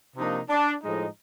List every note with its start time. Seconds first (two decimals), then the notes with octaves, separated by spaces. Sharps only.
0.16 C3 F3 A#3 D4 D#4
0.50 D4
0.83 A2 F3 G#3 D#4